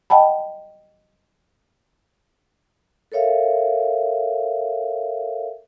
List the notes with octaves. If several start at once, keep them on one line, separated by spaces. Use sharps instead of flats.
D#5 F#5 G5 A5 B5
A4 A#4 C#5 E5 F5